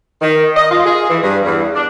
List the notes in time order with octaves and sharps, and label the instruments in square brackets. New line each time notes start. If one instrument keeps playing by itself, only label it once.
[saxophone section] D#3
D#5
F4
G#4
E3
G2
E2
D4